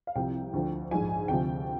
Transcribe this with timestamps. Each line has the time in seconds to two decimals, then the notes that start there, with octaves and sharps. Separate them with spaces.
0.07 F5
0.16 C2 C3 F3 G5
0.53 D2 D3 F3
0.91 A#1 G#2 F3 G#5
1.28 D2 C3 F3 G5